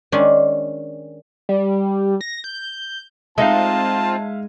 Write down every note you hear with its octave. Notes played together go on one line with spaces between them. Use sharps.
D#3 G#3 C#4 D4
G3
A#6
G6
G#3 C4 D#4 F4 E5 F5 A5